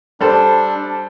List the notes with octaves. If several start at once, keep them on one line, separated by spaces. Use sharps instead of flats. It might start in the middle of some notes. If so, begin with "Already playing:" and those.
G3 D4 A4 C5